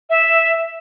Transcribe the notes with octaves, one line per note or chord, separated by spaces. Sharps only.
E5